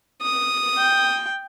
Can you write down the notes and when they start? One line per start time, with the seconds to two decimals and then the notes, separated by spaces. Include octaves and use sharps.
0.22 D#6
0.78 G5